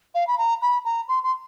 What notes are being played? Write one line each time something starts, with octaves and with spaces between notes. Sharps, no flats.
F5
B5
A#5
B5
A#5
C6
C6